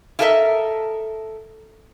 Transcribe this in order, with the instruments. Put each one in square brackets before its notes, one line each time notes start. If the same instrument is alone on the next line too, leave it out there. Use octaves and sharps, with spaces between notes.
[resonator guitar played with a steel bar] E4 F4 A4 A#4 D#5 E5